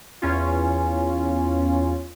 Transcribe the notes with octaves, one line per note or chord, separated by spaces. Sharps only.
E2 C#4 F4